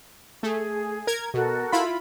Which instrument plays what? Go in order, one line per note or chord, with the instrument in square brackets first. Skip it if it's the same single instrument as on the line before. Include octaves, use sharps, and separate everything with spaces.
[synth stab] A3 [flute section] G#4
[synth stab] A#4 G#6
[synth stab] B2 [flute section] F#4 A4 A#4
[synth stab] E4 F4 B5